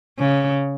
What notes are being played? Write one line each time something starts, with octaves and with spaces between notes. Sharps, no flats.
C#3